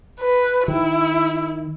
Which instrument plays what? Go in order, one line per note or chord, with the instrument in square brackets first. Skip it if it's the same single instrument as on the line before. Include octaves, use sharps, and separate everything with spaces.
[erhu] B4
[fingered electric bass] D#3 [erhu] E4